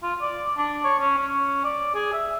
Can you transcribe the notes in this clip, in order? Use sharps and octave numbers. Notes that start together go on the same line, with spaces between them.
F4
D5
D4
C#5
C#4
C#4
D5
G#4
E5